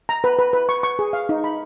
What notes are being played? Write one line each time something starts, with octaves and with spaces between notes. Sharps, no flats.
A#5
B4
B4
B4
C#6
C#6
G#4
F5
D#4
B5